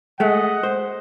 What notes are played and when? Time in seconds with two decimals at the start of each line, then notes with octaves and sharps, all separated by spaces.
0.20 G#3 A3 D#5 F#5
0.63 C5